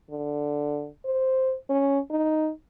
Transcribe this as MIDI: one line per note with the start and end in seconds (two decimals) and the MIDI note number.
0.11 0.87 50
1.05 1.54 72
1.69 1.99 61
2.10 2.50 63